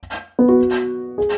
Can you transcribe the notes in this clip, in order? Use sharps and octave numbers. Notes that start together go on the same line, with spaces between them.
B3
F#4
G#4